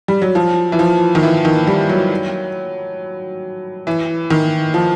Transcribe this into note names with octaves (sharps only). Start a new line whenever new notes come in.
G3
F#3
F3
E3
F3
D#3
E3
D#3
G3
F#3
E3
D#3
F3